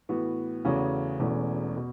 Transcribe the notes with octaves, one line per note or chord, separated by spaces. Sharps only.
A2 E3 B3 F#4
E2 C#3 A3 C#4 F#4
E1 E2 B2 A3 C#4
B2